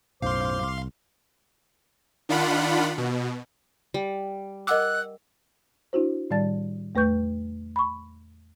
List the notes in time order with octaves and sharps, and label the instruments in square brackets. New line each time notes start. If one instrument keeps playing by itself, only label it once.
[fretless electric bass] B1 F#2 A2 [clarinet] C5 [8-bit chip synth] F5 C6 [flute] D6
[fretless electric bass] C2
[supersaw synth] D#3 D4 F4 F#5 B5
B2
[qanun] G3
[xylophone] A#4 F#5 D6 [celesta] D#5 E6 [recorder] F#6
[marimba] D4 E4 F#4 C5
A2 D#3 G3 D5 A5 A6
E2 A3 B4 C#6 G6
B5 C#6